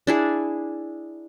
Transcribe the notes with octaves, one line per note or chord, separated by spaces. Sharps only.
D4 E4 G#4